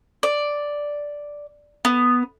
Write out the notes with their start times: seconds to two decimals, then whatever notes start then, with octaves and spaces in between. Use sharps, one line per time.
0.23 D5
1.85 B3